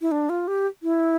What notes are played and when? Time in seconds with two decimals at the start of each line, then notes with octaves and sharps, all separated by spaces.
0.02 E4
0.11 D4
0.29 F4
0.48 G4
0.83 E4